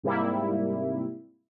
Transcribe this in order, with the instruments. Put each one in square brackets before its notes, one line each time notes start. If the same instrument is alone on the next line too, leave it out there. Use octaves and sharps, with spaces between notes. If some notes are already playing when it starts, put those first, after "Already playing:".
[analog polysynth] G#2 C3 G3 A#3 E4